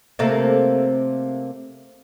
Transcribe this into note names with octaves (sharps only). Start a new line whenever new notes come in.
C3 A3 A#3